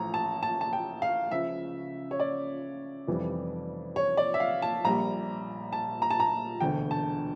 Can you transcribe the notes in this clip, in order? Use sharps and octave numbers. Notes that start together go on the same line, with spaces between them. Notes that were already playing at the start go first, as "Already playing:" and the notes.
Already playing: A1 A2 F3 A#5
A5
A5
A5
G5
F5
C#2 C#3 F3 E5
C#5
D5
F1 F2 E3 G3
C#5
D5
E5
F5
A5
A#1 A#2 G3 A#5
A5
A#5
A5
A#5
E1 D2 D3 G5
A5